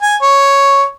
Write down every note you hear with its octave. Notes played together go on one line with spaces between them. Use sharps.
G#5
C#5